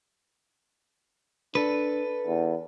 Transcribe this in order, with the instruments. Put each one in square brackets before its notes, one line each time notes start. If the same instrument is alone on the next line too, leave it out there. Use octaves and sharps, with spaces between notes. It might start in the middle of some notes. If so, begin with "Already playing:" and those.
[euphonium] D4 [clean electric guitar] A4 B4
[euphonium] E2